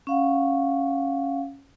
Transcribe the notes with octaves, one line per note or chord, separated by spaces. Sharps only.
C#4 F5 F#5